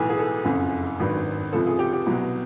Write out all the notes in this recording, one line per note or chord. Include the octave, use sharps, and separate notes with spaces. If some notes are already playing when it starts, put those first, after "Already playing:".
Already playing: B1 A2 E3
G#4
A4
F#1 F2 C#3
G#1 G2 D#3 F#3
C#2 C3 F3 A4
G#4
G4
G4
C2 B2 F#3